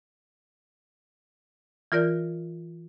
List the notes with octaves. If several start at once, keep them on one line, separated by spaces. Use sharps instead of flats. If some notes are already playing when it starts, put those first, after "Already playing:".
E3 F4 A#4 D5 G6